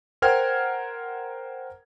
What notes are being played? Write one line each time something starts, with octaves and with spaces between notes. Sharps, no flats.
A#4 C5 F#5 G5 F6 G#6